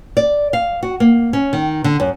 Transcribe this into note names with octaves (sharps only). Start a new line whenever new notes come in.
D5
F5
F#4
A#3
C#4
D#3
D3
F#2